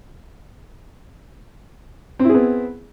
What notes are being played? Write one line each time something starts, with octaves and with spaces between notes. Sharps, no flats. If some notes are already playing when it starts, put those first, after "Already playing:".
B3 C4 E4 G#4